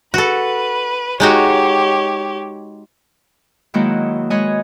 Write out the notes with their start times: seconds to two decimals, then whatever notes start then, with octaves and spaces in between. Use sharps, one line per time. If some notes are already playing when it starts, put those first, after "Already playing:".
0.14 F#4 A4 B4
1.20 G#3 D#4 F#4 G4 C#5
3.74 D#3 F#3 G#3 A#3 E4 F#4
4.30 G#3 B4 C#5 D#5 G#5